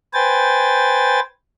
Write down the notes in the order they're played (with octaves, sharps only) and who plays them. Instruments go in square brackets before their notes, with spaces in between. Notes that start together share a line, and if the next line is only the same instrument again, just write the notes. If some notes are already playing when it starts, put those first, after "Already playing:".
[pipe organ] B4 C5 G5 G#5 A6